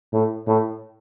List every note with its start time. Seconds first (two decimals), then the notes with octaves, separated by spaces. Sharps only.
0.13 A2
0.47 A2